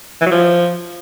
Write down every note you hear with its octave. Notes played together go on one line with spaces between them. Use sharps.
E3
F#3
F3